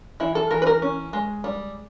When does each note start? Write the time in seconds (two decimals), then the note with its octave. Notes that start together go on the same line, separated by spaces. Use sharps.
0.20 E3 E4
0.35 A4
0.51 E3 A#4
0.62 B4
0.67 A#4
0.82 C#4
1.13 G#3
1.44 G3